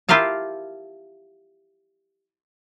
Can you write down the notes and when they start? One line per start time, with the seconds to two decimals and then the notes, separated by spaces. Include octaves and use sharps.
0.09 E4 F4 G4 A#4 F5 A5